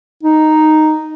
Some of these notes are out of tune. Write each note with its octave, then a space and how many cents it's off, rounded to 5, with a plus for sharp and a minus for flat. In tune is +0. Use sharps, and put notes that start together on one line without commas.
D#4 -5